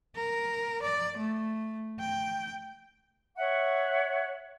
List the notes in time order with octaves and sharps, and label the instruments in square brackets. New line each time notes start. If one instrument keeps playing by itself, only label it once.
[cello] A#4
D5
A3
G5
[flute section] C#5 E5 F#5